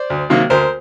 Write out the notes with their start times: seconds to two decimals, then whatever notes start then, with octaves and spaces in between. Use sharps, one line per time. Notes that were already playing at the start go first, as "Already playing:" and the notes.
Already playing: C5 D5
0.10 D2
0.30 C3 D#3 F#3 A#3
0.50 D2 A#4 C5